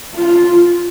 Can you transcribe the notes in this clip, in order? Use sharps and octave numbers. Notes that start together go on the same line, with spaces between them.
F4